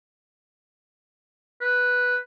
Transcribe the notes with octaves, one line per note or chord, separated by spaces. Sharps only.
B4